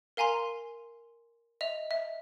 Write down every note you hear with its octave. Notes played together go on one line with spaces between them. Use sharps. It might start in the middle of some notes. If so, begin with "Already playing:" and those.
A#4 F5 G#5 A#5 C6
D#5 E5 F7
E5